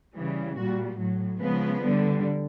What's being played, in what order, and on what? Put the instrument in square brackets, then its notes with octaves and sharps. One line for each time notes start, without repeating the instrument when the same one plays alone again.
[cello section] C#3 E3 G3
A#2 G3 F#4
A2 F#3
C#3 F3 G#3 B3
D3 G3